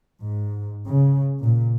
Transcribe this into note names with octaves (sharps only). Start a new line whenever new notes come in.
G#2
C#3
A#2